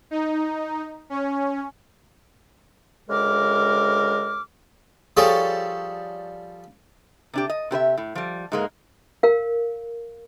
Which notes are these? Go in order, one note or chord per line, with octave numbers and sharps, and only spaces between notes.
D#4
C#4
D2 C#3 G#3 A#4 D6 F6
F3 G3 G#4 A4 C#5 D5
C3 D4 G4
D#5
C3 G4 B4 E5
A2
F3 G3
G#2 G#3 A#3
A#4 F5